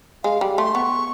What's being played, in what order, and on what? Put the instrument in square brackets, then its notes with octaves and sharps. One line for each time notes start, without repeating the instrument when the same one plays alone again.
[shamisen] G#3 [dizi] F5
[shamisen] G3
[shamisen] A3 [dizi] C6
[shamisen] B3 [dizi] C#6